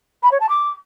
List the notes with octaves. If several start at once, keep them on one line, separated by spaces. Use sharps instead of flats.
B5
C#5
A5
D6